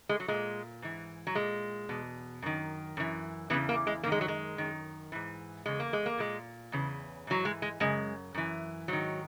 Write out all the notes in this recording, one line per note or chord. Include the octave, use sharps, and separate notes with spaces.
G#3
F#3
A#2 G#3
G#2 E3
F#3
A#2 G#3
E2 B2
F#2 D#3
F#2 E3
E2 C#3 E3 B3
A#3
G#3
F#2 D#3 A#3
G#3
F#3
G#3
F#2 D#3
G#2 E3
E2 C#3 G#3
A#3
G#3
A#3
A#2 G#3
E2 C#3 E3
G#2 E3 F#3
G#3
G#3
F#2 C#3 G#3
F#2 E3
G#2 D#3 F#3